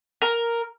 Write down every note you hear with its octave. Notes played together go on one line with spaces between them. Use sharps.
A#4